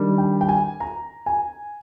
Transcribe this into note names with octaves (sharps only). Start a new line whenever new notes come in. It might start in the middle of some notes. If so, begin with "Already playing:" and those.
Already playing: D#3 G3 D4
G5
G5
G#5
A#5
G#5